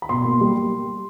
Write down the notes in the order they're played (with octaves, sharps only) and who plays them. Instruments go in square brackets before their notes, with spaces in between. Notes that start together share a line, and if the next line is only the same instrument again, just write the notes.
[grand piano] B5
B2 C6
A#3
G3